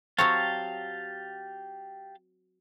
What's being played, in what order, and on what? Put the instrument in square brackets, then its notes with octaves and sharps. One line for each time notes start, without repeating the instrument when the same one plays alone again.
[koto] F#3 C4 C#5 [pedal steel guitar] G4 F5 A5